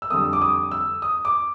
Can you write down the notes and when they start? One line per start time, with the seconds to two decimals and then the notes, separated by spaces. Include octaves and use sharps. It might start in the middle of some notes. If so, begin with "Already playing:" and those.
0.02 E6
0.10 F2 D3 G3 D#6
0.33 D6
0.42 D#6
0.71 E6
1.02 D#6
1.25 D6